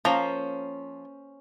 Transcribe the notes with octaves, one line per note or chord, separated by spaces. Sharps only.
F3 A#3 C#4 C5 A#5